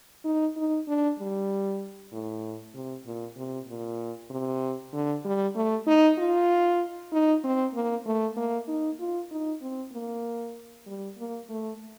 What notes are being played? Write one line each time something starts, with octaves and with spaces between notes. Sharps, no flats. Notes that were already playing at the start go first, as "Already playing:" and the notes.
D#4
D#4
D4
G3
A2
C3
A#2
C3
A#2
C3
D3
G3
A3
D#4
F4
D#4
C4
A#3
A3
A#3
D#4
F4
D#4
C4
A#3
G3
A#3
A3